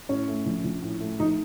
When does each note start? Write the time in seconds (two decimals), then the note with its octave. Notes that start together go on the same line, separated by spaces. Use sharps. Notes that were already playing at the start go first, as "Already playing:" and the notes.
0.09 A2 C#4
0.28 A3
0.46 A#1
0.64 A#1
0.82 A2
1.00 A3
1.19 A#1 D#4